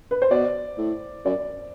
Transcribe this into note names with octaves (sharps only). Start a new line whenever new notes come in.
B4
C5
B2 D5
A2
F#2 D5